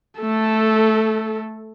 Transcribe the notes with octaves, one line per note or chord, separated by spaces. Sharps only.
A3 A4